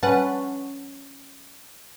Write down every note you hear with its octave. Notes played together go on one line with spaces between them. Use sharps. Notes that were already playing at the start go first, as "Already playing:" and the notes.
C#4 B4 F#5 A5